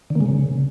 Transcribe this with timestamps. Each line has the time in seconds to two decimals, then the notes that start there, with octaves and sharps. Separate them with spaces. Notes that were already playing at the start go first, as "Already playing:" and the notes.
0.10 D3
0.15 A#3
0.21 G#3
0.26 C#3